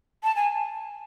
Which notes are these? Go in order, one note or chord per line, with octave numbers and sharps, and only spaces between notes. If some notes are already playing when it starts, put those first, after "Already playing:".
A5
G#5